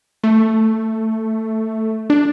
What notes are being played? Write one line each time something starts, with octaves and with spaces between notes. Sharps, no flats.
A3
D4